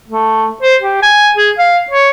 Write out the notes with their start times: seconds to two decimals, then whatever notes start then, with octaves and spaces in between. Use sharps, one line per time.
0.08 A3
0.62 C5
0.81 G4
1.02 G#5
1.36 G#4
1.58 F5
1.90 C#5